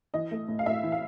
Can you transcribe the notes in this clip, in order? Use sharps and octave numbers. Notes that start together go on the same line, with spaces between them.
E3 D#5
A3
A2
F5
A2 E5
E3
F5